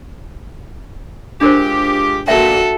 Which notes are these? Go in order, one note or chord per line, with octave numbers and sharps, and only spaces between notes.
G#3 D4 F4 G4 A#4 C5
A#2 F#4 A4 E5 G5